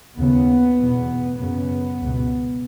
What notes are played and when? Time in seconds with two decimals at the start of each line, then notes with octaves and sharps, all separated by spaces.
0.16 D#2 C#3 B3
0.77 E2 B2
1.38 F#2 C#3 B3
2.00 C#2 B2